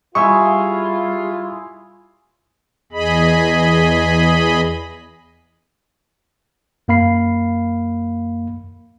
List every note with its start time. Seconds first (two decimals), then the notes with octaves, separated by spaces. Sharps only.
0.15 G3 G#3 E4 F4 G#4 C#6
2.92 E2 G#4 D#5 B5
6.88 F#2 A#3 F5 B5 C7